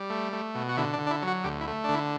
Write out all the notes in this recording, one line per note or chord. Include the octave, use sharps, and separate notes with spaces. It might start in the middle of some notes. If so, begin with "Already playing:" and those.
Already playing: G3
A3
A3
B2
F#4
D3 E4
D4
D3
D4
E4
F#3
F#4
D2 G4
E4
A3
D3 D4
E4